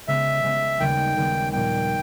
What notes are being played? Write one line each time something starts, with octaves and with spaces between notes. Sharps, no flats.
C#3 G#3 B3 E5
C#3 G#3 B3
D#2 C#3 G3 B3 G5
D#2 C#3 G3 B3
A#1 A#2 G3 B3 G5